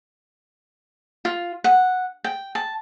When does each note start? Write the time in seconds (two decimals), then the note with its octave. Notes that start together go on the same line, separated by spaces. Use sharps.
1.25 F4
1.64 F#5
2.24 G5
2.55 A5